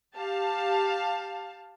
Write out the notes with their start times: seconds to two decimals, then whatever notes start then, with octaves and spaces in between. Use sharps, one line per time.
0.15 G4 F5 A5